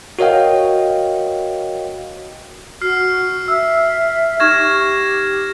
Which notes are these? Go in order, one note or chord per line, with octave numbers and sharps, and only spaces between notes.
F#4 A#4 C#5 D#5 F5 G5
F#4 F6 C7
E5 E6
D#4 G4 C#6 F6 G#6 A#6 E7